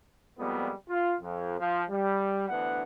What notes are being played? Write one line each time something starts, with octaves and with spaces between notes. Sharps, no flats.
F2 A#2 G3 G#3 B3
F4
F2
F3
G3
D2 E3 B3 D4 F#5